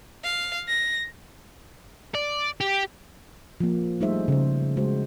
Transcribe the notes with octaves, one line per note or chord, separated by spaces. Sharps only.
F5
A#6
D5
G4
F3 A#3
G3 A3 D#4 G#4 C5 E5
C#3 C5
G#3 F#4 C5